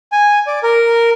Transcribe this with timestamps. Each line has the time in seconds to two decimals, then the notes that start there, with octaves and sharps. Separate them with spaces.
0.12 G#5
0.47 D5
0.63 A#4